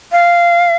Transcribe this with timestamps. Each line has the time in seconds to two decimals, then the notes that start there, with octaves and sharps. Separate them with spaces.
0.12 F5